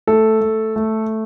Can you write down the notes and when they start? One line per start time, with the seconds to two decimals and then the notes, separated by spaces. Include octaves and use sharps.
0.07 A3 A4
0.41 A3
0.76 A3